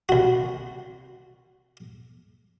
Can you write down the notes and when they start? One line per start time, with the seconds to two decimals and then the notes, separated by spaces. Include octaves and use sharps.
0.09 C2 F#4